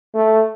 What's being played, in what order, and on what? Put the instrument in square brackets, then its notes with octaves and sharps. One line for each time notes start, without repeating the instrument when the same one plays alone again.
[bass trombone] A3